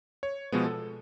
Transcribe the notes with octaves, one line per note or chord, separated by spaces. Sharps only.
C#5
B2 F3 G#3 B3
A4